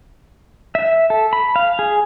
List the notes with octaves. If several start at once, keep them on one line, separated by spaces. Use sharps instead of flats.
E5
A4
B5
F5
G#4